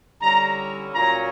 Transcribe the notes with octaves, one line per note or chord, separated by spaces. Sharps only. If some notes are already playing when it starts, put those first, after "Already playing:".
D3 G3 C#4 E4 A#5
A#2 F#3 C#4 A#5